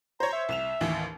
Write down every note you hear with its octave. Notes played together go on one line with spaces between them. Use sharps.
C5 C#5 A#5
E5
C2 E7 F7
A1 D#2 E3